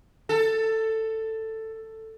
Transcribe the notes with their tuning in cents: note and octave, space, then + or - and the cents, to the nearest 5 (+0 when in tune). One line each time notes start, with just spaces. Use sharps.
A4 +10